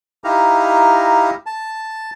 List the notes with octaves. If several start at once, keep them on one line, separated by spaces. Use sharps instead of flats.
D#4 E4 G4 F5 A#5
A5